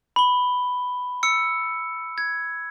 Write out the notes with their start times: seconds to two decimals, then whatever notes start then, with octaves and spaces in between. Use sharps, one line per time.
0.16 B5 G7
1.23 E6 C#7
2.18 G#6